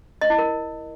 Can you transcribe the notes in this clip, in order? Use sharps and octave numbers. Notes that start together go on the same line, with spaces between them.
D#5
E4
A#4